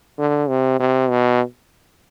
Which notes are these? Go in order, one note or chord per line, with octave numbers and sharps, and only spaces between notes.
D3
C3
C3
B2